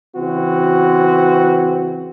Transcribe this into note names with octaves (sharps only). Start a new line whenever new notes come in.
C#3 E3 C4 F#4